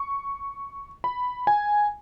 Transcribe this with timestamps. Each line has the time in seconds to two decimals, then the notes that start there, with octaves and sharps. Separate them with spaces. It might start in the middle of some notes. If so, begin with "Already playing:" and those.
Already playing: C#6
1.04 B5
1.47 G#5